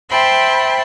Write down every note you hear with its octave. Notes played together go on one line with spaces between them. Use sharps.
C5 E5 G5 A5 B5 C6